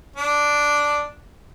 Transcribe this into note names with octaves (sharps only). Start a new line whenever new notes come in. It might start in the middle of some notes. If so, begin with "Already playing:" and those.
D4